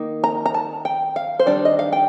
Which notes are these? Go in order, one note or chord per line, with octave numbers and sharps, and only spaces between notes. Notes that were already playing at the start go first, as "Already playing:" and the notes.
Already playing: D#3 A#3 D#4
A#5
A#5
A5
G5
F5
C5
D#3 G3 D4 D5
D#5
F5
G5